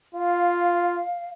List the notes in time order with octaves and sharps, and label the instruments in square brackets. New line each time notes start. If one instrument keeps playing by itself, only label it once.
[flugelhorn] F4 [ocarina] F5